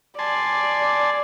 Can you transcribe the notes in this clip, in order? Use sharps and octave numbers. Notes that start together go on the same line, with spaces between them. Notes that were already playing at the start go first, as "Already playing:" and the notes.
D5 G#5 A5 C6